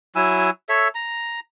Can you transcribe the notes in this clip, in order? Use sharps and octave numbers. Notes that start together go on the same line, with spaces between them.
F#3 E4 G#5 E6
A4 C#5 E5
A#5